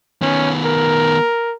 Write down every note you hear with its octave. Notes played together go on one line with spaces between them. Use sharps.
D#3 B3 C#4
A#4